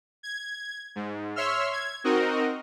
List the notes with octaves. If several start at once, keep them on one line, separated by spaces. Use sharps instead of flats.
G#6
G#2
C#5 E5 C6 E6 F6
G#6
C4 D#4 F#4 A#4 D#5